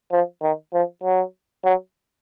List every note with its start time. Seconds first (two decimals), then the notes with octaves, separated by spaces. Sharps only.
0.12 F3
0.42 D#3
0.73 F3
1.03 F#3
1.64 F#3